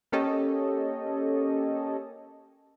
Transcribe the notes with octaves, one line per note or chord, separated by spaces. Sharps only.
A#3 C#4 G4 A4 C#5 D#5